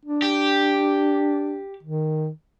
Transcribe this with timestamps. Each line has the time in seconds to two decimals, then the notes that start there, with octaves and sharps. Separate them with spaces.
0.05 D4
0.22 G4
1.83 D#3